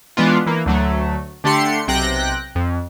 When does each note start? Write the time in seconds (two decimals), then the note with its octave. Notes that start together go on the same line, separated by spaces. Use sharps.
0.17 E3 G#3 B3 D4 F4
0.46 E3 A#3
0.66 D2 F#3 A3
1.44 D3 A3 D4 G4 C6 C#7
1.87 B1 C3 G5 F#6 A#6
2.55 F2